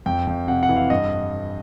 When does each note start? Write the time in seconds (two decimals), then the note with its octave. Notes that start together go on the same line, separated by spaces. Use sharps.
0.06 F2 G5
0.27 F2
0.48 C3 F#5
0.63 F#5
0.69 E3
0.76 F5
0.90 G2 D#5